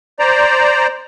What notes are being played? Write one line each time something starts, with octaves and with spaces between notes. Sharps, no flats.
C5 D5 A#5